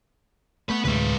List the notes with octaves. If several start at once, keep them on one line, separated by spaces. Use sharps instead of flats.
A3 B3 B4
D2 A2 C3 G#3 B4